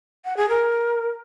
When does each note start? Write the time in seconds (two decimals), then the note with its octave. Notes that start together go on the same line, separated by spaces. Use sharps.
0.25 F#5
0.37 G#4
0.49 A#4